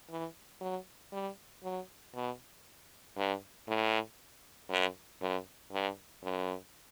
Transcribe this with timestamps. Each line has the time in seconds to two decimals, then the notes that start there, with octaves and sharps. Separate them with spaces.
0.10 E3
0.61 F#3
1.13 G3
1.64 F#3
2.15 B2
3.17 G2
3.68 A2
4.70 F#2
5.21 F#2
5.72 G2
6.23 F#2